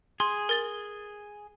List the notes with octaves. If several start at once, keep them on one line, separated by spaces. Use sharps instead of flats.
G#4 C6
A#4 A6 G7